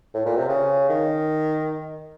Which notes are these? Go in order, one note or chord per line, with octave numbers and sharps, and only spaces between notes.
A2
A#2
C3
C#3
D#3